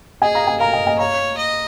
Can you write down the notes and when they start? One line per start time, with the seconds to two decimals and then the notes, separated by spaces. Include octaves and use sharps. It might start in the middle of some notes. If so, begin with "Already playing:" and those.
0.22 G#4 D#5 G#5
0.35 F5 A#5
0.47 D#5 G#5
0.60 A#4 F5 A#5
0.73 D#5 G#5
0.87 D#5 G#5
0.99 C#5 F5 A#5
1.38 D#5